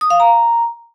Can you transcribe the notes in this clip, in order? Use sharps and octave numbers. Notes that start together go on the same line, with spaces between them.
D#6
F5
A#5